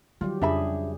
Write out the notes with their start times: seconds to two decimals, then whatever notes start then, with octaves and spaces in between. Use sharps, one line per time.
0.21 D#3 F#3 G3 F4 G4
0.41 F2 C#3 D4 G#4 E5 B5